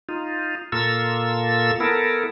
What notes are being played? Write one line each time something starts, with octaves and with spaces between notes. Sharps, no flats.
D#4 F4
A#2 A#3 F4 A4 E6
B3 E4 A4 A#4